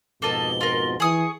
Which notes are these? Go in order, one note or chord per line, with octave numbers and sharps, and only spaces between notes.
F2 G#2 B2 A#3 A4 D#5 G7
F4 A#4
E3 G#4 C#6 D#6